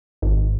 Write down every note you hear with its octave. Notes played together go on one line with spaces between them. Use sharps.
G#1